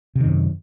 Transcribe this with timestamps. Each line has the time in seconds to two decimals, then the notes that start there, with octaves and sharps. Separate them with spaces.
0.16 C3
0.20 D#3
0.25 F#2